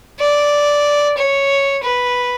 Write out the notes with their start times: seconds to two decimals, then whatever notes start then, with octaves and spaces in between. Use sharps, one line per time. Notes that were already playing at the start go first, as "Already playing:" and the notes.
0.19 D5
1.17 C#5
1.83 B4